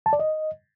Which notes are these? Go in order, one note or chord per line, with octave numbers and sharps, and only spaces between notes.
A5
D5
D#5